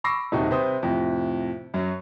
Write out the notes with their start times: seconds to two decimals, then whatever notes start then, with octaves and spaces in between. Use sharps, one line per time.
0.04 B5 C#6 D6 E6 A#6 C7
0.32 D#1 C3 D#4 F#4
0.51 C3 B4 C5 D#6
0.83 F2 A2 C3
1.74 F#2 F#3